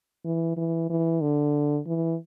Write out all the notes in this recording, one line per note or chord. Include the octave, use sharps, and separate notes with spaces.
E3
E3
E3
D3
E3